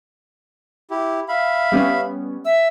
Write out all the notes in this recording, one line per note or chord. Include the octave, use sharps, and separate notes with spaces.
E4 G4
E5 F5 B5
G3 B3 C#4
E5 E6